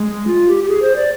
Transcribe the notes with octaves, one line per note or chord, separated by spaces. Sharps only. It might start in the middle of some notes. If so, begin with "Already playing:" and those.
Already playing: G#3
F4
G4
G4
G#4
C5
D5